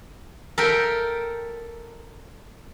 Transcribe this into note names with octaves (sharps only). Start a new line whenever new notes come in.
A4 A#4 E5 G5